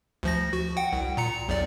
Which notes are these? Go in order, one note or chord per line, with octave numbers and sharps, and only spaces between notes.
D2 F3 A#6
F#4
F#5 G5
C2
A#2 A#5 C#7
B1 E2 D5